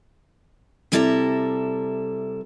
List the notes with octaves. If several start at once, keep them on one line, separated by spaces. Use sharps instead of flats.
C3 G3 E4 A4 D5 A#5